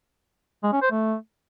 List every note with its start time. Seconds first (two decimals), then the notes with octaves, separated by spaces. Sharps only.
0.63 G#3
0.73 C#4
0.82 C5
0.91 A3